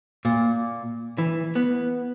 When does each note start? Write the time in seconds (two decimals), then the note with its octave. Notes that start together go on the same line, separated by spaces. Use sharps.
0.25 A#2
1.18 E3
1.55 B3